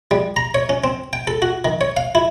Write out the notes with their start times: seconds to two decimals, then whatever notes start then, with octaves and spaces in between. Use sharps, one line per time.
0.11 G3
0.36 A#5
0.54 C#5
0.69 C#4
0.84 C4
1.13 G5
1.27 A4
1.42 F#4
1.65 D#3
1.81 C#5
1.97 F5
2.15 E4